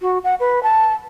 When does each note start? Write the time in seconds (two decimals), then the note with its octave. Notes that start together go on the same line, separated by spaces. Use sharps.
0.02 F#4
0.24 F#5
0.40 B4
0.63 A5